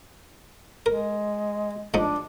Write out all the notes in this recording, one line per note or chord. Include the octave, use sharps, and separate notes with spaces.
G#3 A#4
G#2 F3 D4 D#4